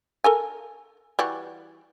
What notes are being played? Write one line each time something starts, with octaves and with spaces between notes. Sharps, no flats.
A4 A#4 G#5
E3 G3 F#4